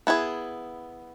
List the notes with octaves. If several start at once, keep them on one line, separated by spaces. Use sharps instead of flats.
B3 E4 G#4